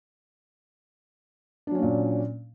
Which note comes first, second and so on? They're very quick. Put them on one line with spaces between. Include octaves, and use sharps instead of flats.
D4 F#3 C#4 A#3 A#2